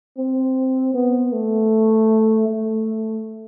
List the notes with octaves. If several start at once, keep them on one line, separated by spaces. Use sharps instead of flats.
C4
B3
A3
A3